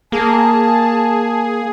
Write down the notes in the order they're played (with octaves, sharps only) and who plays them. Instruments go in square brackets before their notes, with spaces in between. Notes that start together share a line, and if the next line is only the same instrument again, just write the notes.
[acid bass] A#3 [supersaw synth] G#4 [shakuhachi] A5